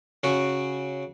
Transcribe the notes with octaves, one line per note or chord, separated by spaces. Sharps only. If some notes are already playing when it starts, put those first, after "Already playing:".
C#3 F#4